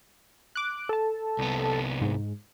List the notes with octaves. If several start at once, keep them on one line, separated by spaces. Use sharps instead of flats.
D6 F#6
A4 A5
C2 B3
G#2